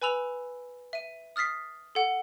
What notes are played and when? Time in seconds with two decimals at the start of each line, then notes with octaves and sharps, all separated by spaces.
0.02 B4 G#5 B5 E6 F7
0.93 E5 D#7
1.36 D#6 F6 A6 B6 C7
1.95 A4 F#5